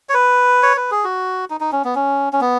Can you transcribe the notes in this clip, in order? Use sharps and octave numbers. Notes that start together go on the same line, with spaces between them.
C#5
B4
C#5
B4
G#4
F#4
D#4
D#4
C#4
B3
C#4
C#4
B3